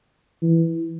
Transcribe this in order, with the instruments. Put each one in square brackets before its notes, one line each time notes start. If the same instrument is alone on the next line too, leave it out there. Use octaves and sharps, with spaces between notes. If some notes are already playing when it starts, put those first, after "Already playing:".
[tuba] E3